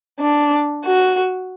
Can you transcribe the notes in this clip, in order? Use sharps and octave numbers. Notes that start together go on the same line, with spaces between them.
D4
F#4